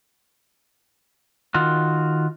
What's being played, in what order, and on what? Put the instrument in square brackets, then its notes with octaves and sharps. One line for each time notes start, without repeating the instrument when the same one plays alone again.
[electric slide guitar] D#3 F4 F#4